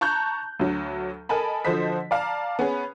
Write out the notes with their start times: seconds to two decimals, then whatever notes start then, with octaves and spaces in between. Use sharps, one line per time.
0.01 A5 A#5 C#6 F#6 G6
0.59 D2 F#3
1.29 A4 A#4 D#5 G#5 A5 B5
1.65 D3 F3 F#4 C5 D#5 B6
2.11 D5 F5 A5 A#5
2.59 B3 C#4 G#4